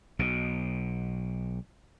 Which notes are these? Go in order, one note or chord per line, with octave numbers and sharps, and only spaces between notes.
B1 B2